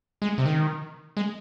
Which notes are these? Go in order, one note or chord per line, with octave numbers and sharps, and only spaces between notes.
G#3
C3
D#3
G#3